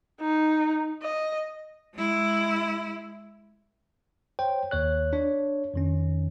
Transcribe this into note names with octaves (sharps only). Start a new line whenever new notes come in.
D#4
D#5
G#3 E4
C5 C#5 G5
D#2 C#5 F#6
D4 C#5
F2 D#3 C#4